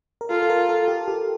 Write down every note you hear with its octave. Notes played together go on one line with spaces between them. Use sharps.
A#4
F4 A4
A4
A#4
A4
G4
G4